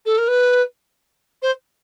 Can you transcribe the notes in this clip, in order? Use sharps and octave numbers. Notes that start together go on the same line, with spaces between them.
A4
A#4
B4
C5